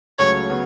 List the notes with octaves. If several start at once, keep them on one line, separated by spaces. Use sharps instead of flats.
C#2 C#3 F#3 A3 C#4 C#5
C#3 F#3 B3